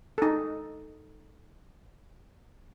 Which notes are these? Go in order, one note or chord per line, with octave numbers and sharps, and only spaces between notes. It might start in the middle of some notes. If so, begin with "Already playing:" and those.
D#4 A4